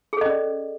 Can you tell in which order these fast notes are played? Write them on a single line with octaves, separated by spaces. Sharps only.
G#4 A4 D#5 C#4 D5